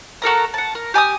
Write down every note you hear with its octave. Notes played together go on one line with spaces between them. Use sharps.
F#4 A4 A#4 A#5
F#5 A5
A#4
G4 G#5 A5 D#6